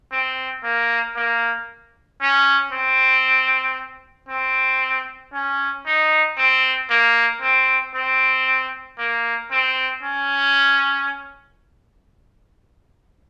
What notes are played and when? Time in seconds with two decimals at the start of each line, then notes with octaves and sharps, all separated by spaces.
0.12 C4
0.64 A#3
1.16 A#3
2.21 C#4
2.72 C4
4.29 C4
5.33 C#4
5.86 D#4
6.37 C4
6.90 A#3
7.41 C4
7.94 C4
8.98 A#3
9.51 C4
10.03 C#4